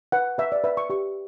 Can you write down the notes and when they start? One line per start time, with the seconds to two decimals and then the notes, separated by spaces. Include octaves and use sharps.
0.12 B4 F#5
0.38 B4 E5
0.52 D5
0.64 B4 E5
0.77 C#6
0.90 G4 C#6